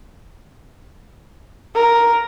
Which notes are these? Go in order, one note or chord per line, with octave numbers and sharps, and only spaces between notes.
A#4